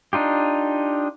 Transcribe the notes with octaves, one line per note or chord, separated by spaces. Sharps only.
D4 D#4 F4 G4